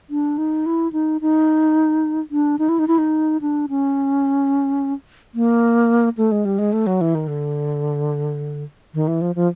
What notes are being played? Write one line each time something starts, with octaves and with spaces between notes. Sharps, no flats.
D4
D#4
E4
D#4
D#4
D4
D#4
E4
D#4
E4
D#4
D4
C#4
A#3
A3
G#3
G3
G#3
A3
F#3
E3
D#3
D3
D#3
E3
F3
F3